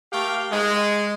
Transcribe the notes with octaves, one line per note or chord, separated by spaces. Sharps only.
A3 G4 A#4 F5 G5
G#3